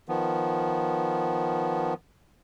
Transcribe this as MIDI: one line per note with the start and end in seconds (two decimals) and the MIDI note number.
0.09 1.94 51
0.09 1.94 53
0.09 1.94 59